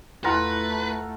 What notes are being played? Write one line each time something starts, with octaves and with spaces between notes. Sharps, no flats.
E2 A3 E4 F4 B4 F#5 A#5